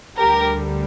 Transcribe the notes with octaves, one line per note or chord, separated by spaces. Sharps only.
D2 D3 G3 G4 A#4